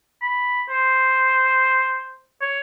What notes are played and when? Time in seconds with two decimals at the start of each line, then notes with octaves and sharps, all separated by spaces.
0.22 B5
0.69 C5
2.41 C#5